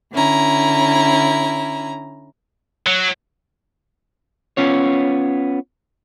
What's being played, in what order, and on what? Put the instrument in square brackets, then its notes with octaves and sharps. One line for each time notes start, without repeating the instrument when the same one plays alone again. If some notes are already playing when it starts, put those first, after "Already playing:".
[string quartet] D3 C#4 E4 A#5
[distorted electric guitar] F#3
[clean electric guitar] B3 C#4 F4 C#5